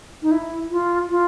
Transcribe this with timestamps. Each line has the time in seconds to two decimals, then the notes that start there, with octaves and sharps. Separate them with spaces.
0.22 D#4
0.31 E4
0.71 F4
1.10 F4